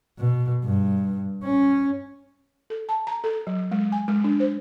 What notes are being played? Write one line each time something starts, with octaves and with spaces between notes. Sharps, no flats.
B2
G2
C#4
A4
A5
A#5
A4
F#3
G#3
G#5
G#3
D4
C5